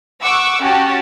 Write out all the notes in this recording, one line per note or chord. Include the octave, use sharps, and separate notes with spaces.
F#5 C#6 D6 E6
C#4 F#4 G4 A5